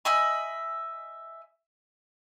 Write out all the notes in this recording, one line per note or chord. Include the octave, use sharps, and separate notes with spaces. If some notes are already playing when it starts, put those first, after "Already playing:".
D#5 E5 G#5 B5